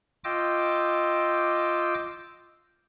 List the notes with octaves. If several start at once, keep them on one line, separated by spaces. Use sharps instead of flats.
F4 D#5 G5 D6 E6